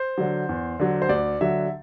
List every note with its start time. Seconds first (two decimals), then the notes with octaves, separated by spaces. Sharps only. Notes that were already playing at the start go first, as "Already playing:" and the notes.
Already playing: C5
0.18 D3 F#3
0.49 E2
0.79 D3 F#3
1.02 C5
1.09 D2 D5
1.41 D3 F#3 E5